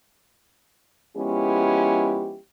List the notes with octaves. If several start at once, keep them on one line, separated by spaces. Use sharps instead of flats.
F3 G#3 B3 C#4 E4 G4